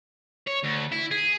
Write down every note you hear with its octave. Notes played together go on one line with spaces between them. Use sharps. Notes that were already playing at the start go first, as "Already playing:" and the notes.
C#5
D2
E4
G#4